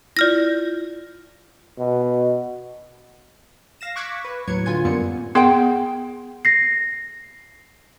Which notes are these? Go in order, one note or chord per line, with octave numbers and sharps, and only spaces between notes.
E4 F4 D5 F6 A#6
B2
F5 A#6 E7
C#6 D6 F#6 G#6 B6 C#7
B4
D#2 A2 F#3 G#6 C#7
D3 F4 G#5 G#6
F#2 G3 A#3 B3 C#7
B3 G#4 F#5 G5 C6
A#6 C7